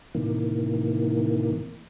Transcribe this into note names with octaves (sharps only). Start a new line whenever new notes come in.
A2 C3 D#3 E3 A#3